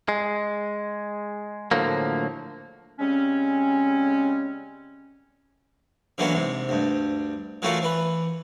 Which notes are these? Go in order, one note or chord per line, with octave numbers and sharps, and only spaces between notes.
G#3
A2 D3 F3 F#3 A#3
C#3 G3 G#3 C4 C#4
D3 E3 F#3 A#3 B3 C#4
G#2 C3
D2 G2
E3 F#3 A3 A#3 F4 F#4
E3 B4